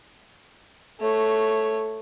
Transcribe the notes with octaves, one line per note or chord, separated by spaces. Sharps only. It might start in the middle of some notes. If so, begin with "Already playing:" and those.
A3 C#5